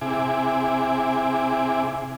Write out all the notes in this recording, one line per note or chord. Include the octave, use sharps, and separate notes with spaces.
C3 E4 G#4 D6